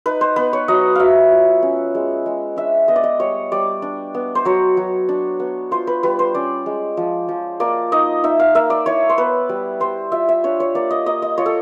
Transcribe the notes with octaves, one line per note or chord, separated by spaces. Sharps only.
D#4 B4
C5
B3 B4
C#5
F#3 D#5
F#3 E5 F5
F4
C#4
G#3
G#3
D4 E5
B3 D#5
D5
D#5
G3 C#5
G3 D5
D4
B3
C5
F#3 C#5
F#3
D4
B3
F4 C5
B4
G3 B4
C5
C#4 D5
G#3
F3
F3
A#3 D5
D#4 D#5
D#4 E5
F5
A#3 E5
D5
E4 C#5
C5
B3 B4
G3
G3 C5
F4 E5
E5
D4 C#5
C#5
A#3 D5
D#5
A#3 D#5
D#5
F4 C#5
A4